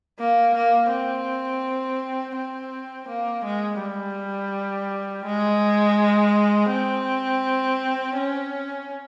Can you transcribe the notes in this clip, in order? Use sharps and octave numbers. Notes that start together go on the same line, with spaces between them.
A#3
A#3
C4
C4
A#3
G#3
G3
G#3
C4
C#4